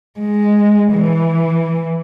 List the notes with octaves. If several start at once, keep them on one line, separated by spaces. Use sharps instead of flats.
G#3
E3